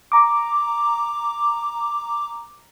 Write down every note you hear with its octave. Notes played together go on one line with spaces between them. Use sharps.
A#5 D6